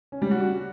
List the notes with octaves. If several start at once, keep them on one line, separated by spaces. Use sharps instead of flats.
C#4
G3
F#4